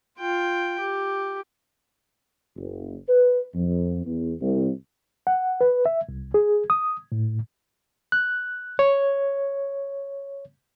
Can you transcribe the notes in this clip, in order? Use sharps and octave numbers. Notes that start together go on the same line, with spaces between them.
F4 G5
G4
F#1
B4
F2
E2
C2
F#5
B4
E5
C2
G#4
D#6
A2
F#6
C#5